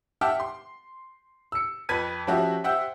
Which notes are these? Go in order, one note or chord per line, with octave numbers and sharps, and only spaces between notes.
E5 F#5 G5 A5 D6 F6
C6
E6 C#7
F2 B4 B5 G#6 B6 D#7
F3 C#4 F#4 G4 E5
C5 E5 F#5 G5 E6 G6